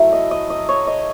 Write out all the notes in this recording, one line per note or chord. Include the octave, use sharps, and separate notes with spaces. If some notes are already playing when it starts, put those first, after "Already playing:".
Already playing: F#3 A3 E4
D#5
D#5
D#5
C#5
D#5